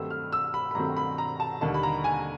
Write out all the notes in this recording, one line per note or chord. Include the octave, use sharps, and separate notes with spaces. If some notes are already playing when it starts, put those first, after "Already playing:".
Already playing: G2 D#3 F#3 A3 C4 E6
F6
E6
B5
B5
G2 D#3 F#3 A3 C4 A#5
B5
A#5
A5
D#2 D3 G3 A#3 D#4 A5
B5
A#5
G#5